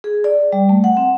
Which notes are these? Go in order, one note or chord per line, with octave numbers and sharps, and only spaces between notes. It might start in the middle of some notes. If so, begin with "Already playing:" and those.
G#4
D5
G3
A3
F#5
C4